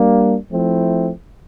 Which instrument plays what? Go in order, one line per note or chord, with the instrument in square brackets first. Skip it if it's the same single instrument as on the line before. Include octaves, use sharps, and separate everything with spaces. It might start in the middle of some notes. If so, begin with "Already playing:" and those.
Already playing: [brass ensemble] G3 A#3 D4
F3 A3 C4 E4